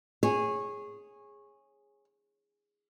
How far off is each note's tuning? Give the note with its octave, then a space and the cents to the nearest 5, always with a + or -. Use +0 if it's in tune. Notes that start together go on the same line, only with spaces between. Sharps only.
G#4 -5 C#5 -20